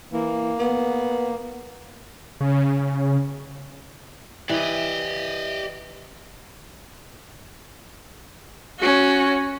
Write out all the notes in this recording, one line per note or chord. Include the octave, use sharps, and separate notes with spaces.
E3 A#3
B3
C#3
E3 G4 D5 D#5
C#4 F#4